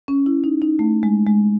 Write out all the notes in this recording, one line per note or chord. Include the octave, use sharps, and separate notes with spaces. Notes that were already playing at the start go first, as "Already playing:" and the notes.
C#4
E4
D#4
D#4
A3
G#3
G#3